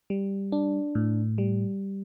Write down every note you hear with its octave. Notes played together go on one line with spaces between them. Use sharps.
G3
D4
A2
G3